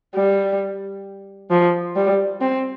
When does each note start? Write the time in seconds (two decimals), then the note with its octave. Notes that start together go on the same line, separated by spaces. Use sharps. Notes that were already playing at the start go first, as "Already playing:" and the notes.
0.15 G3
1.51 F3
1.96 G3
2.41 C4